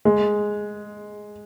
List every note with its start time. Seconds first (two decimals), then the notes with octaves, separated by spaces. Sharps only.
0.05 G#3